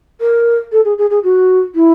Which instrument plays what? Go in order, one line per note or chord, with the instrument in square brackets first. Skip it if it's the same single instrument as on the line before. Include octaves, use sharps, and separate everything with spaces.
[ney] A#4
A4
G#4
G#4
G#4
F#4
E4